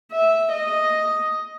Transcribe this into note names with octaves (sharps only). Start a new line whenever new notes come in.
E5
D#5